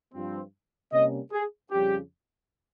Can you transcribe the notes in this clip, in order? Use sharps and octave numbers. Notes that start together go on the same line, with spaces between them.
G2 F3 C4
C3 G3 A#3 C#4 D#5
G#4
F2 C#3 G3 C#4 G4